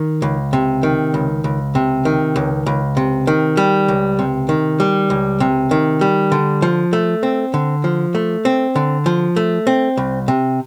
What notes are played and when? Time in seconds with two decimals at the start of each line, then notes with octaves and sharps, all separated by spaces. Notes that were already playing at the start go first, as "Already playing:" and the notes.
Already playing: D#3
0.22 C#2
0.53 C3
0.83 D#3
1.14 C#2
1.44 C#2
1.75 C3
2.05 D#3
2.36 C#2
2.66 C#2
2.97 C3
3.27 D#3
3.57 G3
3.88 C#2
4.19 C3
4.49 D#3
4.80 G3
5.10 C#2
5.40 C3
5.71 D#3
6.01 G3
6.32 D3
6.62 F3
6.93 A3
7.23 C4
7.54 D3
7.84 F3
8.15 A3
8.45 C4
8.76 D3
9.06 F3
9.36 A3
9.67 C4
9.97 C2
10.28 C3